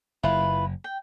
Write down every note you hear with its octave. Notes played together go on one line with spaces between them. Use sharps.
F#1 E4 F4 B4
G5